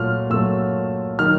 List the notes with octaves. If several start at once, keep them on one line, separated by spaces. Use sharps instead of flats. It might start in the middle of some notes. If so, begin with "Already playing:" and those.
Already playing: A#2 F#3 A3 F6
A#2 F#3 A3 E6
D#3 F#3 F6